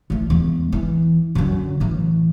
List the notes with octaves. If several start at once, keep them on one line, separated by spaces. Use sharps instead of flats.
E3 A3
E2 G#3
E3
F#2 D3
A2 E3